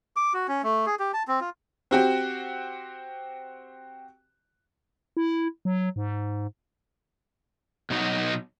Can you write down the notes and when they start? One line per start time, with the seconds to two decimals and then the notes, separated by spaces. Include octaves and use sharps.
0.16 D6
0.34 F#4
0.48 C#4
0.63 A3
0.86 G#4
0.99 G4
1.14 A5
1.28 C4
1.41 F4
1.91 C4 F#4 G4
5.17 E4
5.65 F#3
5.96 G#2
7.90 B2 F#3 D#4 F#4